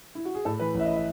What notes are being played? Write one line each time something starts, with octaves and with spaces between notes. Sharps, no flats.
E4
F#4
G#4
A2 A4
E3 B4
A1 E5
D#5
E5